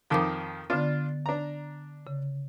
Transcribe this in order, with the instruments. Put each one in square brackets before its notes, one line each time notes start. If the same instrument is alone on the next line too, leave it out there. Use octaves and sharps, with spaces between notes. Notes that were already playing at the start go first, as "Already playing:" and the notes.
[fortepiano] F2 D#3 F3 [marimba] A#4 D6 D#6
[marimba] D3 B3 [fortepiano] D4 F4
[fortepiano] D4 A#5
[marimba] C#3